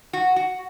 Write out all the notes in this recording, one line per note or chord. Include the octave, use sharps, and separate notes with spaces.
F#4
F#4